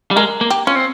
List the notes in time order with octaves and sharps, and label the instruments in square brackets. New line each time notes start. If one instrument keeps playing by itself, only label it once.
[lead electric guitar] G3
[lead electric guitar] G#3 [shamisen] A#4
[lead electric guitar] A#3
[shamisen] G4
[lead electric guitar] C#4 [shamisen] F4
[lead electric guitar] C4